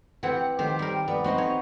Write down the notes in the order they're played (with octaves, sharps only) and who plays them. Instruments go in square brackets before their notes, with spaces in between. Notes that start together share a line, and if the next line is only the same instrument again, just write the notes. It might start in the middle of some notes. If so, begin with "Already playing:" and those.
[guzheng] E3 C4 G4 [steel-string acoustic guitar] F#5
[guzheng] D#3 [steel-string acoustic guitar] G4 C5
[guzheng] G3 A#4
[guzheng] B3 [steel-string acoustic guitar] D5
[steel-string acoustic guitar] B3 C4 D#4 [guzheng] F#4
[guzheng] C#5